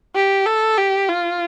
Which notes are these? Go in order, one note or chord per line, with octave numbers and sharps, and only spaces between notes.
G4
A4
G4
F4